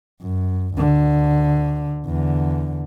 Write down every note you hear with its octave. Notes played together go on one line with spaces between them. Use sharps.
F#2
D2 D3
E2 D3